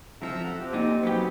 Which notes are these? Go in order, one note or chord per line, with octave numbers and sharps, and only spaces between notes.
F2 F3 A4 E5 A#5
F#5
C4 G4
A#2 D#4
F#3 B3 C4 G4